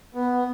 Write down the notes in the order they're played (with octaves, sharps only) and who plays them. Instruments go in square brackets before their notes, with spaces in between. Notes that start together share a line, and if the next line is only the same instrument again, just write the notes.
[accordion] B3